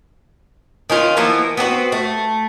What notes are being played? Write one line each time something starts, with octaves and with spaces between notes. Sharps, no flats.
D#3 C#4 F4
E3 F3 A#3 B3
B3 C4 D4 F#4
A3